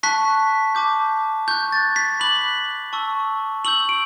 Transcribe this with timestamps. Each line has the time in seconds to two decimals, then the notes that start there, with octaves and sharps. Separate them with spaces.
0.03 A5 C#6 F#6 B6
0.75 A5 D6 G6
1.48 C#6 F#6 G6
1.72 A6
1.96 B6
2.20 B5 D6 F#6 F#7
2.93 A5 C#6 E6
3.65 C#6 E6 G6 F#7
3.89 D7